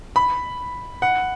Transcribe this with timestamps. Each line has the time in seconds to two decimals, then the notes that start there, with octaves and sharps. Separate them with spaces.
0.16 B5
1.02 F#5